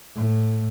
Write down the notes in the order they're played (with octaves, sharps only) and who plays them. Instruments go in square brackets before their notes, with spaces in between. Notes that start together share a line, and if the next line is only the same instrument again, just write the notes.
[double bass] A2